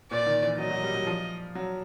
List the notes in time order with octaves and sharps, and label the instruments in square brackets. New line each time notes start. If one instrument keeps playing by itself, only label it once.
[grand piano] A#2 [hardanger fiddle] D5
[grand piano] D#3
E3
[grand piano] F#3 [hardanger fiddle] D#5
[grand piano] F#3
G3
F#3
F3
F#3